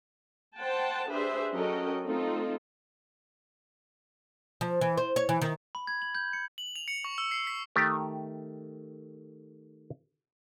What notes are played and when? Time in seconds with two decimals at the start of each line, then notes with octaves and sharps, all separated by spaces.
0.57 C5 F#5 G5 A5
1.07 D4 G4 G#4 B4 C5 E5
1.54 F#3 C#4 A4 A#4 D#5 G5
2.04 A3 C4 D#4 F4 A4
4.61 F3
4.81 E3
4.98 C5
5.16 C#5
5.29 E3
5.42 D#3
5.75 B5
5.87 G#6
6.02 F#7
6.15 G6
6.33 C#7
6.58 F#7
6.76 F7
6.88 C#7
7.04 C#6
7.18 E6
7.31 C7
7.47 B6
7.76 D#3 A3 G4